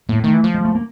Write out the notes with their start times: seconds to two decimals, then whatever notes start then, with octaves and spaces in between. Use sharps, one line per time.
0.09 A2 A#3
0.24 D#3 A3
0.34 E3
0.44 F3
0.54 G#3
0.65 A3
0.75 A#3